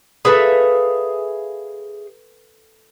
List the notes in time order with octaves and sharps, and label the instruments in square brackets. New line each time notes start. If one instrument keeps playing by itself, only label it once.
[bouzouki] G#4 E5 F5 [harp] A4 B4 B5